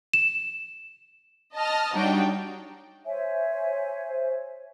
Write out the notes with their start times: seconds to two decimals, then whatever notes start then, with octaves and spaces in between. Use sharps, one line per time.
0.14 E7
1.56 D#5 A5 D#6 F6
1.94 G3 D4 D#4 F#4 C#5 G5
3.06 C5 C#5 E5 G#5